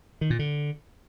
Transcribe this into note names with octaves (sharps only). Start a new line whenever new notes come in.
D#3
A#2
D3